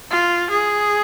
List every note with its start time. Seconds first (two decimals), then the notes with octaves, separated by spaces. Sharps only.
0.10 F4
0.51 G#4